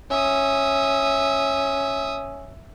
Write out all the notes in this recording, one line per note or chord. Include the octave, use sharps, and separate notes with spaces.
C#4 E5 D#6